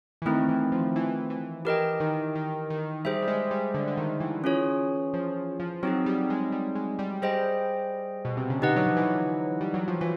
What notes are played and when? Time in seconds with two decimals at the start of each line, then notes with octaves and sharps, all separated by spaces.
0.22 E3
0.26 D#3 A3 C4 E4
0.49 E3
0.72 F3
0.96 E3
1.30 E3
1.65 E3 G4 A#4 D#5 G5
2.00 D#3
2.35 D#3
2.70 D#3
3.05 G3 G#4 C5 E5
3.22 G3
3.28 G#3
3.51 G3
3.74 D3
3.88 D3
3.97 D#3
4.20 E3
4.44 C#4 F4 G#4 C#5
5.14 F3
5.60 F3
5.83 F#3 C4 D#4 G#4
6.06 G3
6.30 G#3
6.52 G3
6.75 G#3
6.99 G3
7.22 G3 G#4 C5 D#5 G5
8.25 B2
8.37 C3
8.50 C#3
8.61 D3 D#4 G4 B4 D#5 F#5
8.76 F#3
8.86 F3
8.97 E3
9.61 G3
9.74 F#3
9.88 F3
10.01 E3 F4